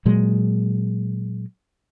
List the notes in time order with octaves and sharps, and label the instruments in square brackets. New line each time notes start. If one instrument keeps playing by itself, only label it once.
[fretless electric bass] A#2 F#3 G#3